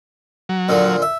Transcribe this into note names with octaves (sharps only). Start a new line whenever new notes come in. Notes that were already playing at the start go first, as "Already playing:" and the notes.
F#3
A#2 D3 F3
E5